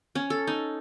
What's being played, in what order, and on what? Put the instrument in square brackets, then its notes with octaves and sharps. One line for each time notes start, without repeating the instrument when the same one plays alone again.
[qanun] C#4
A4
D#4